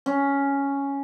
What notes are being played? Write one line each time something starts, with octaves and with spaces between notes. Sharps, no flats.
C#4